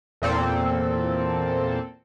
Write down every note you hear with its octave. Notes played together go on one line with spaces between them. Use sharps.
E2 A#2 C4 A4